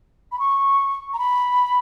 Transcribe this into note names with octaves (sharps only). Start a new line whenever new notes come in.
B5
C#6
A#5
B5